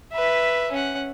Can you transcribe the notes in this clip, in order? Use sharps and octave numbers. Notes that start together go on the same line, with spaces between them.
B4 E5
C#4 F#5